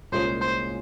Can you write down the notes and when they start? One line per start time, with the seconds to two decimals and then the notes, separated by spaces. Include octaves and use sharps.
0.12 C2 A#2 G#3 C#4 G#4 C5
0.41 C5